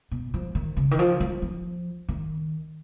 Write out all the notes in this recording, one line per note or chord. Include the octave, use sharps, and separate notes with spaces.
B2
F3
D#3
C#3
D#3
F3
F#3
F3
D#3